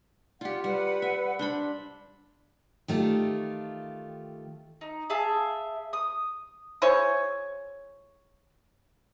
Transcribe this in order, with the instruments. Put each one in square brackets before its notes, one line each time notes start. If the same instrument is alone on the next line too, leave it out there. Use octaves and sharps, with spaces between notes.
[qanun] F4 G4 [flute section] D5 F#5
[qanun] G3 [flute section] B4 F#5
[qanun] E5
D4 C5 B5
[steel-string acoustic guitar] D#3 A3 F4 G4
[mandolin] D#4
G#4 E5 F5 A5
D#6
[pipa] E4 G#4 C5 C#5